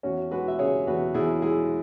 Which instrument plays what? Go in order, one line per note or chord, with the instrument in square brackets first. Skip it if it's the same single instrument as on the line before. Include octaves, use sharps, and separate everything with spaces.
[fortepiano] E2 C#4 F#4
G#3 F#4 B4
E5
C#3 G#4 C#5
E2 F#4 B4
E2 E4 G#4
G#3 E4 G#4